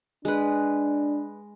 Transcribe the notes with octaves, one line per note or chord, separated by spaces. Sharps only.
G#3 D4 B4